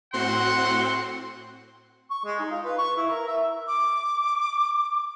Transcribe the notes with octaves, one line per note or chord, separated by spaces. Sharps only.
A2 C4 F#4 F#5 C6
C#6
G#3
D#4
F4
B4
C#6
E4
A#4
E5
D6